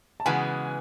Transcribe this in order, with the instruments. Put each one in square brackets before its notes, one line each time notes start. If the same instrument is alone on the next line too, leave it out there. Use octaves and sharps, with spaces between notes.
[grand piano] A5
[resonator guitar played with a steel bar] C#3 E3 G#3 B3 F#4 [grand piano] G#5